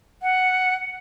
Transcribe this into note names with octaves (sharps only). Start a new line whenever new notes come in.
F#5